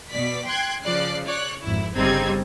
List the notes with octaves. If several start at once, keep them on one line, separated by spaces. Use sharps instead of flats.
B2 D5 B6
G5 C6 F#6 G#6
C#3 F3 D5 F#6 C7
C#5 D5 F#6
G#1 F2 E4
G1 C#3 G3 C4 D#4 G#6